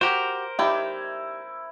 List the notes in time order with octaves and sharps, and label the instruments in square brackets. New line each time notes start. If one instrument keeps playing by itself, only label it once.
[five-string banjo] F#4 G4 [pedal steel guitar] A#4 C5
[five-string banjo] D#4 G4 D5 [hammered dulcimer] E4